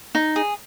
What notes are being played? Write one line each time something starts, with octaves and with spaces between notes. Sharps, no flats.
D#4
G#4